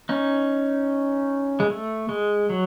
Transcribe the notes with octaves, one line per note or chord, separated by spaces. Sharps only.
C#4 D#4
G#3
A3
G#3
F#3